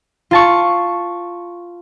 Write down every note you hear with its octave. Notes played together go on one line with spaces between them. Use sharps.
F4 A5 C#6